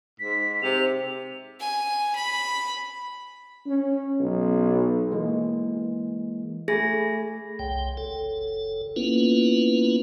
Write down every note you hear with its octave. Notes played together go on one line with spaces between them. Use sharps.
G#2 B6
C3 F7
G#5
B5
C#4
B1
E3 G#3 A#3
A3 G#4 G#5 B5 A#6
F#1 C2 G5
F#1 A4
A#3 B3 C#4 E4 F4 B4